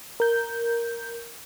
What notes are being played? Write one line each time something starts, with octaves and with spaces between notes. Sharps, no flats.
A#4 G6